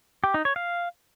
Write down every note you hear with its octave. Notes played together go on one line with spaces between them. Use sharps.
G4
D#4
C#5
F5